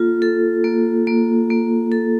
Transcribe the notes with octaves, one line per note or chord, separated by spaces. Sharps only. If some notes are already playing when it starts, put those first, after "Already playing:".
Already playing: A#3 F4 A4
A4
A#3
A#3
A#3
A4